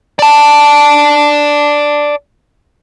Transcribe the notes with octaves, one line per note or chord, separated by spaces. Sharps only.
D5 A5